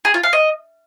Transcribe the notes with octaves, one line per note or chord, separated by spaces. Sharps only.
G#4
F4
F5
D#5